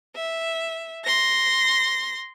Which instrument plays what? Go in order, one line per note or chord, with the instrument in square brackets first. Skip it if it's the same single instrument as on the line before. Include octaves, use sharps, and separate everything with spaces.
[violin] E5
C6 A#6